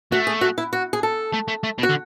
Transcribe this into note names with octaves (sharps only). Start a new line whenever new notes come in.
A3 F#4
G#4
F#4
E4
F#4
G#4
A4
A3
A3
A3
B2
F#4
D3